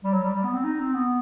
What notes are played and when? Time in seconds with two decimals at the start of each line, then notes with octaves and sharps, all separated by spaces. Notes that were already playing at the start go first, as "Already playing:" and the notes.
0.04 G3
0.13 F#3
0.23 G3
0.34 G3
0.44 B3
0.53 C4
0.64 D#4
0.79 C4
0.94 B3